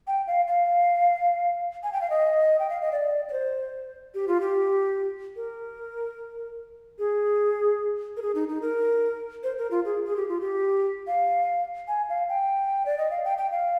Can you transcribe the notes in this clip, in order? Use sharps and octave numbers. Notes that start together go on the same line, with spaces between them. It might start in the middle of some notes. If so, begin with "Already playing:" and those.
G5
F5
F5
G#5
G5
F5
D#5
G5
F5
D#5
D5
D5
C5
G4
F4
G4
A#4
G#4
A#4
G#4
D#4
D#4
A#4
C5
A#4
F4
G#4
G#4
G4
F4
G4
F5
G#5
F5
G5
D5
D#5
F5
G5
G5
F5